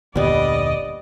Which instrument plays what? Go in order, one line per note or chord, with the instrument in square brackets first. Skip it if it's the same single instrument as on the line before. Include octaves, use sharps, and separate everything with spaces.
[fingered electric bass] F1 D2 A#2 [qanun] G3 B3 [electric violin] D5 D#5